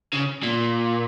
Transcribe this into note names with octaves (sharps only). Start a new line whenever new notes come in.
C#3
A#2